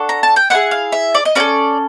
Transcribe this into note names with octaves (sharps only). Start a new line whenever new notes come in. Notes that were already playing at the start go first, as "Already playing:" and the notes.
Already playing: D4 F#4 A4
A#5
A5
G5
B3 E4 G#4 F#5
F5
E5
D5
D#5
C#4 F#4 A4 D5